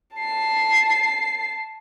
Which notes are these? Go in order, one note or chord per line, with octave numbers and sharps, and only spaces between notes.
A5 C7